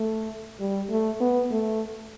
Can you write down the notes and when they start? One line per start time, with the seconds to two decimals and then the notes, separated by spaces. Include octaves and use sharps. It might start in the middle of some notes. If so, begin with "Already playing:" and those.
Already playing: A3
0.60 G3
0.90 A3
1.20 B3
1.51 A3